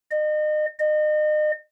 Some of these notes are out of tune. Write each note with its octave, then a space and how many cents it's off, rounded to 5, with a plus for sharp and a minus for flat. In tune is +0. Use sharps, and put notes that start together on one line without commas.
D#5 -35
D#5 -35